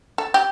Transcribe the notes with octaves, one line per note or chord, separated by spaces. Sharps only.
A4
G4